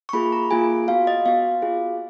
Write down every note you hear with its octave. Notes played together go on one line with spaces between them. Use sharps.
C#6
A#3 F4 G#4 B5
A#5
A#3 F4 G#4 G#5
B3 F#4 F5
D#5
B3 F#4 F5
B3 F4 G#4